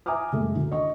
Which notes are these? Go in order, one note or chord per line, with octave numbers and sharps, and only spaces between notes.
E5 G#5 A#5 D6 D#6 F6
F#1 G#3 A3
D2
D#5 C#6